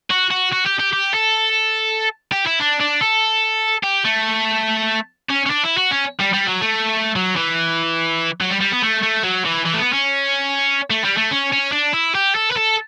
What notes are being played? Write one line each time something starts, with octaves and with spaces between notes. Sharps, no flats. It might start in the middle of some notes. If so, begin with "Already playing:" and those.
F#4
F#4
F#4
G4
G4
G4
A4
G4
E4
D4
D4
A4
G4
A3
C#4
C#4
D4
E4
F#4
C#4
G3
G3
F#3
A3
F#3
E3
F#3
G3
G3
B3
A3
A3
F#3
E3
E3
A3
B3
C#4
A3
G3
A3
C#4
C#4
D4
E4
G4
A4
B4
A4